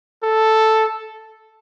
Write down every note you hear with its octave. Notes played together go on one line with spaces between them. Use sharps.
A4